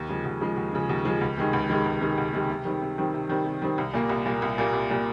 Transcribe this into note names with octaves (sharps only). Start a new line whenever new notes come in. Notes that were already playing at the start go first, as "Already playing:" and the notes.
Already playing: D#2
C#3 F3 G#3
D#2
C#3 F3 G#3
D#2
C#3 F3 G#3
D#2
C#3 F3 G#3
C#2
C3 D#3 G#3
C#2
C3 D#3 G#3
C#2
C3 D#3 G#3
C#2
C3 D#3 G#3
C3
D#3 G3 C4
C3
D#3 G3 C4
C3
D#3 G3 C4
C3
D#3 G3 C4
C2
A#2 G3 A#3
C2
A#2 G3 A#3
C2
A#2 G3 A#3
C2
A#2 G3 A#3